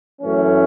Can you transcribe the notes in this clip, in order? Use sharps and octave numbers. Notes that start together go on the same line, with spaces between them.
F#2 E3 A3 C#4